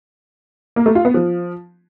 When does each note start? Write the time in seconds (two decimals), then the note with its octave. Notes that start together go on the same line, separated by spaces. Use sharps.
0.76 A#3
0.86 A3
0.95 F4
1.05 B3
1.14 F3